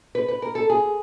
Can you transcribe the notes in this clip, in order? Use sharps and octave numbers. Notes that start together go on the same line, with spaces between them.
B4
B4
A#4
A4
G#4